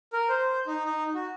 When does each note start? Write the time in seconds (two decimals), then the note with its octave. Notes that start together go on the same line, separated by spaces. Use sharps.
0.13 A#4
0.29 C5
0.67 D#4
0.84 D#4
1.15 F#4